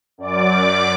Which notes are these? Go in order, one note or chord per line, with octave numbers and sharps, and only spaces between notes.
F#2 D5 D6